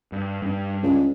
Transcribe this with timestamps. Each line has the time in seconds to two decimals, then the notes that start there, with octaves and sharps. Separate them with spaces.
0.12 G2
0.42 G2 D4
0.83 C#2